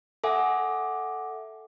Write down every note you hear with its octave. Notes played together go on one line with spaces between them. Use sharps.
A4 E5 F#5 G#5 D6